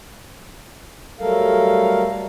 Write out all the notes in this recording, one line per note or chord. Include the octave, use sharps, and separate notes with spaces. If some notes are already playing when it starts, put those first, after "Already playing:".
F#3 G3 A3 A4 A#4 F5